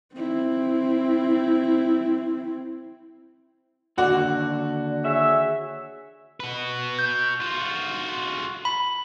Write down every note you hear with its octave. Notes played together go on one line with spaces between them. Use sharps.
C4 E4
D#2 D3 F#4 D5
G#4 C#5 E5
F#4 B4
G6
F4 F#4
B5